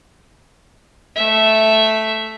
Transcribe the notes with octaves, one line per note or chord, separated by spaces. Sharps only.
A3 E5